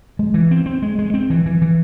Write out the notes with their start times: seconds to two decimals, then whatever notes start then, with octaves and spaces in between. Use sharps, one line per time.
0.19 G#3
0.34 E3
0.51 C4
0.66 C4
0.82 G#3
0.99 G#3
1.14 C4
1.30 E3
1.46 E3
1.62 E3